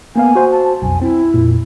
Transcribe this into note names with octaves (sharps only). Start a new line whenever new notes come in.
A#3 B3 F5 G#5
F#4 C5
A5
B1 F2 G#5
C4 E4
F2 A#2